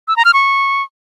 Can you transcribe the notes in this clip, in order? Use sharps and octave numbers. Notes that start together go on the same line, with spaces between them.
E6
A#5
F6
C#6